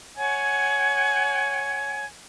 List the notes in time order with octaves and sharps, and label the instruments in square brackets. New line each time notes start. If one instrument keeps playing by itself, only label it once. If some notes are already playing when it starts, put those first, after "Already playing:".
[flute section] C#5 F#5 G#5 G#6